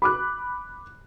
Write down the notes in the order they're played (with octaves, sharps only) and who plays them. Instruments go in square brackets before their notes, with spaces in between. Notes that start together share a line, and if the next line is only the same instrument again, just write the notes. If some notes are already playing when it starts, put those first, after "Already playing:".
[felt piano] B5 D6 F#6